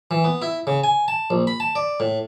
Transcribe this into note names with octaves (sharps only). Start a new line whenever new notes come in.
E3
B3
E4
C#3
G#5
A5
A#1
B5
A5
D5
A2